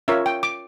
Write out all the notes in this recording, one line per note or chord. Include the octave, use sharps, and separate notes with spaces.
C#4 F4 A#4 C#5 E5
G5
D6